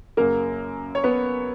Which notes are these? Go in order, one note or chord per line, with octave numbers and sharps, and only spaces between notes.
F#2 C#3 F#3 A#3 A#4
C#5
B3 B4